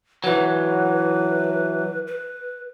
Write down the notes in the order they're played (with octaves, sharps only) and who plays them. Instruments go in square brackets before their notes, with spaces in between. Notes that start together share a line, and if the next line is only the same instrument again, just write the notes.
[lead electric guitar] E3 F#3 [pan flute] B4
[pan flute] B4